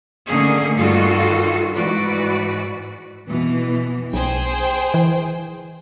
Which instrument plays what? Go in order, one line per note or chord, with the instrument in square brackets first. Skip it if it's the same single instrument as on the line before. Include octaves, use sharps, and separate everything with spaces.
[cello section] D3 D#3 A3 A#3 C#4 G#4
G2 D#3 G3 F4 F#4 A4
G#2 E3 F#4 B4 D5
[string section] F2 B2 E3
[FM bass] B1 [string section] G#4 C5 G5
[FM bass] E3